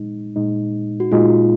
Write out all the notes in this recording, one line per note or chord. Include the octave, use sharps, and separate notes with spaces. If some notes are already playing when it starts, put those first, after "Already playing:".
Already playing: A#2 G#3 D#4
A#2 G#3 D#4
F#4
A#2 G#3 D#4 F4